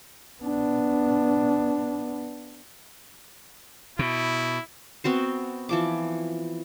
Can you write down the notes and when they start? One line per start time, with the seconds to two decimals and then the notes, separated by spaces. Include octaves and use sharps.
0.42 B3 D4
3.99 B2 E4
5.04 B3 C4 F#4 C5
5.69 E3 F3 D6